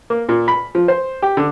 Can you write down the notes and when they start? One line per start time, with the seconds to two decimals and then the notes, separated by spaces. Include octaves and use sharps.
0.10 A#3
0.29 A#2
0.48 B5
0.75 F3
0.88 C5
1.22 G4
1.37 D3